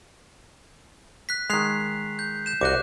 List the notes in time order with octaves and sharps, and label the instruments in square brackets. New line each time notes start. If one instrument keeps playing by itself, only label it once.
[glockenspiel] F#6 B6
[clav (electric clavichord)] D#3 G#3 [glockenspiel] F#6 C7 F7
[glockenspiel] G6
G6 E7
[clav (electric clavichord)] C2 F#4 D#5 [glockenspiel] D6 F#6